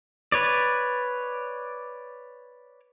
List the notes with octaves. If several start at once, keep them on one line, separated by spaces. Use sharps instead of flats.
B4 C#5 D5